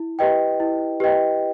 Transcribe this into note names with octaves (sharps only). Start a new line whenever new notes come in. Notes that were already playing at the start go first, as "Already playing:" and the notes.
Already playing: E4
G4 B4 D#5 G5
E4
G4 B4 D#5 G5